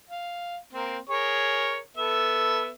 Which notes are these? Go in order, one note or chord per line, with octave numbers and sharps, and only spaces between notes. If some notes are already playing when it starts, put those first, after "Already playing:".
F5
A#3 C4
G#4 A#4 C#5
B3 A4 E5